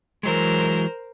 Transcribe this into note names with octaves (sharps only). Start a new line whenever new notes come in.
E3 F#3 G#3 A#4 C5